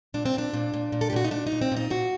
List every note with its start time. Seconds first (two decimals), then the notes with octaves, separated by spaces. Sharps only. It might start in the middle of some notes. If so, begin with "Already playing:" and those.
0.14 A#2 D4
0.25 C4
0.33 A#2 D4
0.53 A#2
0.74 A#2
0.92 A#2
1.01 A4
1.10 G4
1.13 A#2 F#4
1.24 D#4
1.31 A#2 D4
1.47 D#4
1.52 A#2
1.61 C4
1.72 A#2 D#4
1.90 A#2 F#4